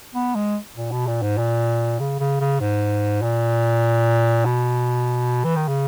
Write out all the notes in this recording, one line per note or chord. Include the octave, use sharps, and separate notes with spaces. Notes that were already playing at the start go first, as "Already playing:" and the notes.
B3
G#3
A#2
B2
A#2
G#2
A#2
C#3
C#3
C#3
G#2
A#2
B2
E3
D#3
C#3